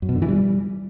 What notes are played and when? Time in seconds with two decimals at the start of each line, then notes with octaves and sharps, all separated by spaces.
0.02 F#2
0.09 B2
0.15 D3
0.22 E3
0.28 G3